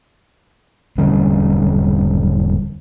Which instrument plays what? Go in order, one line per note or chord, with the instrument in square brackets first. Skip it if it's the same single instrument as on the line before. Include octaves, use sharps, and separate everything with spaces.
[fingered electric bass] E1 D3 G3 C#4